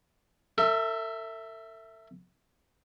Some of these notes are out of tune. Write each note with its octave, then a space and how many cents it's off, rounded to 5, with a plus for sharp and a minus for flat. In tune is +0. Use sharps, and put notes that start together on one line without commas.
A4 +45 E5 +0